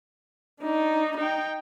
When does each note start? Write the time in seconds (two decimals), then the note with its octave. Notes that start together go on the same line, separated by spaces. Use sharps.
0.61 D4 D#4
1.17 D#4 G5